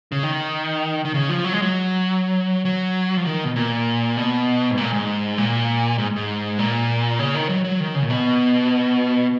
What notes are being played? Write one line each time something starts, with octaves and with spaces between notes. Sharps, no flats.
C#3
D#3
D#3
C#3
F3
F#3
G#3
F#3
F#3
F3
D#3
B2
A#2
B2
G#2
A#2
G#2
A#2
G#2
G#2
A#2
C#3
D#3
F#3
F#3
D#3
C#3
A#2
B2